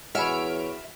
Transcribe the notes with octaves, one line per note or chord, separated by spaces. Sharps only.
E2 F#4 C#5 E5 G#5 B5 F6 D7